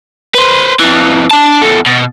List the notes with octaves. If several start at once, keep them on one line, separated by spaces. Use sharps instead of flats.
B4 C5
F2 E3
D4 A5
E2 A4
B2